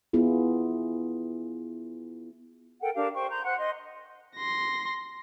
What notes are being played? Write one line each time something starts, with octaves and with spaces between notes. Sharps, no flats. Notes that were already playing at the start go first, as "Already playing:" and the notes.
B3 E4 F4 G#4
A4 A#4 F#5 G5
D4 G4 A#4 F5
C5 G5 C#6
A#5 C6 G6
C5 F#5 C6 F#6
D#5 C6
C6 A#6